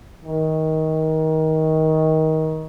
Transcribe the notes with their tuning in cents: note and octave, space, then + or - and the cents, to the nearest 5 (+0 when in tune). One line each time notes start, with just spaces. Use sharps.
D#3 +20